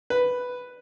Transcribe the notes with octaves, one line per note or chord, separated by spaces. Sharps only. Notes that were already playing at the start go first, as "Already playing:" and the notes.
B4